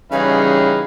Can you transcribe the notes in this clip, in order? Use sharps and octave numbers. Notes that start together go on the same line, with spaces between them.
C#3 E3 G3 C#4 D#4 G#4 B4 F5